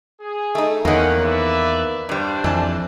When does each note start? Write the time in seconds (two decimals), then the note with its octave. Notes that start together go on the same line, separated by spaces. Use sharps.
0.21 G#4
0.55 A3 D#4
0.85 E2 D#3 A#3 C#4 F#5
1.21 B4 D5 E5
2.09 G2 G3 D4 C5
2.44 F2 E3 A5